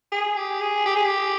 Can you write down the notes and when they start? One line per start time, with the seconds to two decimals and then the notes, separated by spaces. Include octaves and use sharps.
0.12 G#4
0.36 G4
0.61 G#4
0.86 G4
0.96 G#4
1.05 G4